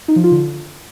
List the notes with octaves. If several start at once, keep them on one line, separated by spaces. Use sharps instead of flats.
D#4
F3
F4
D3